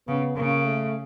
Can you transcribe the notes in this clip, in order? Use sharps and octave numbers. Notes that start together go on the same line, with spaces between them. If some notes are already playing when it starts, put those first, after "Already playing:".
C#3 B3
C#3 A#3
A3